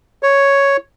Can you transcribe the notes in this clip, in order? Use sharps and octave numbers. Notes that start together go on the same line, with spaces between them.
C#5